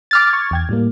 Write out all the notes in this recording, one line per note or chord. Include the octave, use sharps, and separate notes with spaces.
D6 F6 A6
C#6 G#6
E2 G5 G#6
A2 G3 A#3